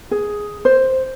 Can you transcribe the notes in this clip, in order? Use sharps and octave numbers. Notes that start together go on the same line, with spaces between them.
G#4
C5